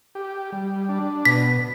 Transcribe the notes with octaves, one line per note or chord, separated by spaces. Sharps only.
G4
G3
D4
B2 B6